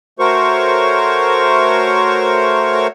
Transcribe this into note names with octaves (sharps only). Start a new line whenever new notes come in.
A3 F#4 A#4 C5 C#5 C#6